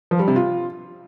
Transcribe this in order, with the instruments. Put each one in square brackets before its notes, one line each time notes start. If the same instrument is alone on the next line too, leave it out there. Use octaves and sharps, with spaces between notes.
[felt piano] F3
G3
C3
F4